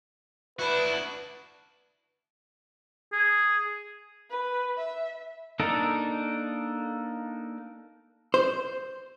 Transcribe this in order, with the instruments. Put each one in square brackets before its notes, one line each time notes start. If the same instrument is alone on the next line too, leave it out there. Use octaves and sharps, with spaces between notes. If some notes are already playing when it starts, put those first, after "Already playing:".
[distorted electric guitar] D4 F#4 [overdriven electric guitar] E4 [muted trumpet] B4
[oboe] G#4
[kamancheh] B4
E5
[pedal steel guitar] A#3 D4 D#4 A4 A#4
[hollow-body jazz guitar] C5